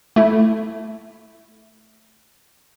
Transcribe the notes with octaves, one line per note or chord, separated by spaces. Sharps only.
A3 E4